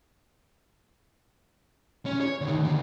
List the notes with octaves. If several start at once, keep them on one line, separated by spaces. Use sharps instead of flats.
C#4
C#5
D2 D#3
D#2 D3